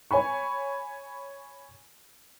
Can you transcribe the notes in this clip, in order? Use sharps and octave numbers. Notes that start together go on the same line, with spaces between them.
C#5 G#5 B5 C#6